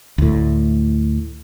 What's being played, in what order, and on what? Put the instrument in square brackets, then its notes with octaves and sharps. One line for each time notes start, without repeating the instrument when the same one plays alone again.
[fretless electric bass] D2 A2